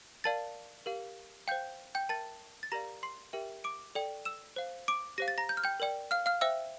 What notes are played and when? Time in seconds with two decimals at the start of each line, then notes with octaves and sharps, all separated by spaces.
0.24 A#4 D5 F5 A5 A6
0.86 G4 A#4 F5
1.48 C5 F5 G5 G6
1.95 G5 G6
2.09 A#4 E5 G5 A5 A6
2.63 A6
2.72 G4 A#4 D5 F5 A#5 A#6
3.03 C6 C7
3.33 G4 A#4 E5 G5
3.64 D6 D7
3.95 A4 D5 G5
4.25 E6 E7
4.56 C5 F5
4.88 D6 D7
5.18 G4 C5 F5 A#6
5.28 A6
5.38 A#5 A#6
5.49 G6
5.57 F6
5.64 G5 G6
5.80 A#4 D5 G5
6.11 F5 F6
6.26 F5 F6
6.41 C5 E5 G5 E6